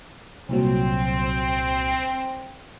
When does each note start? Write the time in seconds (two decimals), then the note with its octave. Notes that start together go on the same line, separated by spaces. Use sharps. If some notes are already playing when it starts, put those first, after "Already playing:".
0.49 C2 A#2 F#3 C4